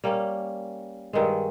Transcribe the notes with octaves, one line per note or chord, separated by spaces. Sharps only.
G3 A#3 C#4
G2 D#3 G#3